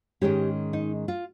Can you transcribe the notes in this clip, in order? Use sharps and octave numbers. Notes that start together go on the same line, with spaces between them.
G#2 D#3 G#3 C#4 G4
D#4
F4